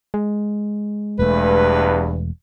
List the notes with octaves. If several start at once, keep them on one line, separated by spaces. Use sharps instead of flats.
G#3
E1 E2 G2 A3 B4